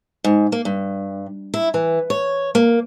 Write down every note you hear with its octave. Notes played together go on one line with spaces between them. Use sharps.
G#2
A#3
G2
E4
E3
C#5
A#3